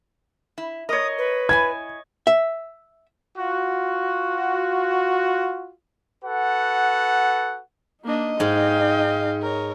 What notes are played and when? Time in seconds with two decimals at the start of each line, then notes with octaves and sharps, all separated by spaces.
0.58 E4
0.89 A#4 C#5 D#5 D#6
1.18 B4
1.49 E4 G5 G#5 G#6
2.27 E5
3.38 F4 F#4
6.24 F#4 A4 B4 F#5
8.04 A#3 D4 D#4 D#5
8.40 G#2 F5 G5
9.42 A#4 C#5